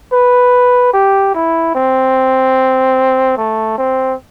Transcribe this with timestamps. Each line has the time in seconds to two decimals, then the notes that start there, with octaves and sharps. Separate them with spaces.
0.13 B4
0.94 G4
1.35 E4
1.75 C4
3.37 A3
3.78 C4